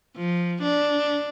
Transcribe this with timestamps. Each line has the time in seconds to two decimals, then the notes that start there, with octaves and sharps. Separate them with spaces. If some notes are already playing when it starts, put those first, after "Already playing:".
0.16 F3
0.63 D4